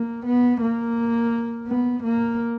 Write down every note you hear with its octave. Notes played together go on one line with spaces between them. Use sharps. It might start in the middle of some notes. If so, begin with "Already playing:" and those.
Already playing: A#3
B3
A#3
B3
A#3